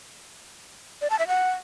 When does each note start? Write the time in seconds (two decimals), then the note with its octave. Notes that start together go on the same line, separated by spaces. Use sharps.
1.01 D5
1.10 A5
1.19 E5
1.28 F#5